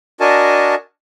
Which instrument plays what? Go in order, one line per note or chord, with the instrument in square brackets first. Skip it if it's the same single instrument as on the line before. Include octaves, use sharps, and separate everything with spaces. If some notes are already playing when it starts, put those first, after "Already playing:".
[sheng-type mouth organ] D4 F#4 A#4 D#5 G#5 A5